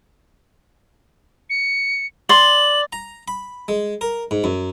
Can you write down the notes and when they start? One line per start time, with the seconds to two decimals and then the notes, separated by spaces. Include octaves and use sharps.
1.50 C#7
2.29 D5 C6 F#7
2.93 A#5
3.28 B5
3.68 G#3
4.01 A#4
4.31 G#2
4.44 F#2